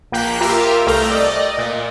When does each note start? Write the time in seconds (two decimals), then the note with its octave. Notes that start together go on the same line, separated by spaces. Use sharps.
0.12 A#1 A#3 G5 F#6 G6 B6
0.41 F4 G4 A#4 E5 F5 F6
0.87 C2 A3 G5 A#5
1.11 D5 D#5
1.58 A#2